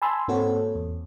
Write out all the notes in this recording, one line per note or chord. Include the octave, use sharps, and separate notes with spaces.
G#5 A5 B5 C6 E6
G#2 A#3 C4 F#4 A4 C#5
E2